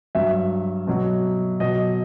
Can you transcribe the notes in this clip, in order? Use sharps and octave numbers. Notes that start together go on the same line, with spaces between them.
G2 F#3 E5
B2 F#3
B2 F#3 D#5